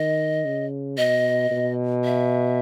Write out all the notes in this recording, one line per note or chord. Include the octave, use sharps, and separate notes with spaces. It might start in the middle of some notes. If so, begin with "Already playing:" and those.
Already playing: D#3 D#5
C#3
B2 D#5
B2
E5